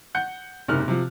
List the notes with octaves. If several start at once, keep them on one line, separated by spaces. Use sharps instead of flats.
F#5 G6 C#7
F#1 G#2 C3 A#3 F6 F#6
C3 F3